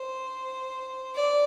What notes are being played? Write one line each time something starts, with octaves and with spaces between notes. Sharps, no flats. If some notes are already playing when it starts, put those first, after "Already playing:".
Already playing: C5
D5